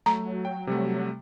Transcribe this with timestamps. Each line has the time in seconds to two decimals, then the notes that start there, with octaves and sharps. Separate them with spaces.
0.06 F#3 A3 A#5
0.45 G5
0.67 C3 G3 A3